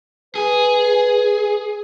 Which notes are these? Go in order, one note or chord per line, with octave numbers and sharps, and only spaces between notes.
G#4 B4